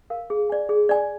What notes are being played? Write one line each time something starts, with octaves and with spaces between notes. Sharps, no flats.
A#4 F5
G#4
D5 G#5
G#4
D5 G#5